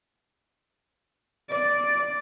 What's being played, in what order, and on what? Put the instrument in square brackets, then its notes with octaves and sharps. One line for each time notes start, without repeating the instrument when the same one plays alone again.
[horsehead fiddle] D5